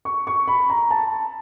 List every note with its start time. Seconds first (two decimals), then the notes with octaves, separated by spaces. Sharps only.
0.05 C#6
0.27 C#6
0.48 B5
0.70 A#5
0.91 A5